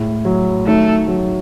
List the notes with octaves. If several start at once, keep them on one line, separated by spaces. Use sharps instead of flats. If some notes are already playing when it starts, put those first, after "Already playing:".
Already playing: A2 G#3
F#3
D#3 A3
F#3